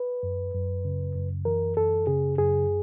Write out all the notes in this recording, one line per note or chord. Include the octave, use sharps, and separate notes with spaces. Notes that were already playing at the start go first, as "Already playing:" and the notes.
Already playing: B4
F#2
F#2
C#3
F#2
E3 A#4
F#2 A4
C#3 G#4
F#2 G#4